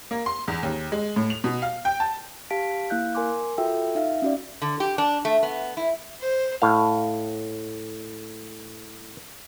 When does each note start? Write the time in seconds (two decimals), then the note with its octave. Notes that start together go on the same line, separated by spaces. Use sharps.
0.11 A#3
0.26 C6
0.48 E2
0.63 D#2
0.92 G#3
1.16 A2
1.30 F7
1.44 B2
1.62 F5
1.85 G5
2.00 A5
2.50 G4 F5 A5 B6 D7
2.90 A#3 E4 F5 F#6 G6
3.15 A#4 G#5 C6 D6
3.58 F4 F#4 A4 E5 G5 E6
3.95 D#4 E5 F5
4.22 C#4 F#4 D5
4.62 D3
4.80 G4
4.98 D4
5.25 A3
5.43 B3
5.77 E4
6.20 C5
6.62 A2 F5